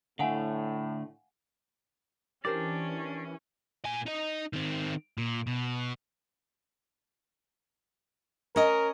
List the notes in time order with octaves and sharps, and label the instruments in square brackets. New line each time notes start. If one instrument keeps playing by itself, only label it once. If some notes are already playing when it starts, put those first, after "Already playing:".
[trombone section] A2 [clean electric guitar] D3 A3 [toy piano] F5 F#5 G#5
[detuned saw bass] E3 [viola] C#4 [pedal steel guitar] D4 D5 [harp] G4 A#4 C5
[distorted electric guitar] A#2 G#5
D#4 D#5
D#3 C4
A#2
B2
[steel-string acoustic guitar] C#4 D#5 [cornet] A#4